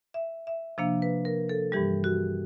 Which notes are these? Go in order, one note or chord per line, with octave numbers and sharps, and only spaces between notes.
E5
E5
C3 F3 A#3 D4 F5
B4
A#4
A4
G2 E3 G3 G4
F#4